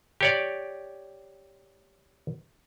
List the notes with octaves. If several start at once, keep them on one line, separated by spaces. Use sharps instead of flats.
G4 C#5 D5